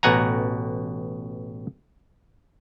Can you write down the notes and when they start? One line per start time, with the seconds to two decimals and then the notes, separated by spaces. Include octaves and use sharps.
0.03 A1 B2 F#5 G#5 A#5